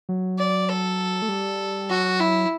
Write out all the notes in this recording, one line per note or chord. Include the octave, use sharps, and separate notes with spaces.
F#3
D5
A4
A3
G3
F#3 F#4
E4